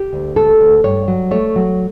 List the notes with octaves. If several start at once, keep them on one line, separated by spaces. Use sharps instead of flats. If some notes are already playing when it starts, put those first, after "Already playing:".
Already playing: G4
D2
A3 A4
D2
G2 C#5
F#3
A3 C#5
F#3